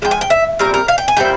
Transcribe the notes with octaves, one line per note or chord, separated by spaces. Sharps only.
F3 G#3 G5
G#5
G5
E5
A#2 G3 C4 A#4
A#4
F5
G5
G#5
A#2 G3 C4 E4 G5